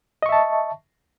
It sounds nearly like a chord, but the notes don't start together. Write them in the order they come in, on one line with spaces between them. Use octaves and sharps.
D#5 C#6 E5 A5